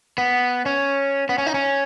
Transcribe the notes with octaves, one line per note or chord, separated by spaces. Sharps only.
B3
C#4
B3
C#4
D#4
C#4